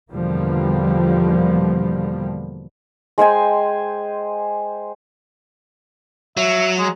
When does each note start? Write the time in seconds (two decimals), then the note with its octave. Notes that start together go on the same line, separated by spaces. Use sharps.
0.11 E2 B2 D3 F3 G3 A#3
3.18 G#3 C5 G5 G#5
6.37 F#3 E5
6.79 G#3